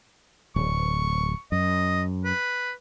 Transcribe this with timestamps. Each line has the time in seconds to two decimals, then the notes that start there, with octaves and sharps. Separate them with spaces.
0.56 D1 C#6
1.52 F#2 D#5
2.24 B4